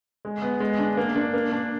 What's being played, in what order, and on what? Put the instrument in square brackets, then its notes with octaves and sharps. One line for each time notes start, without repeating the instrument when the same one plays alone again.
[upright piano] G#3
B3
G#3
D4
A#3
D4
A#3
D4